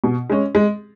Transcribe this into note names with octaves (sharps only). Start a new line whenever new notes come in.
B2
G#3 C#4
G#3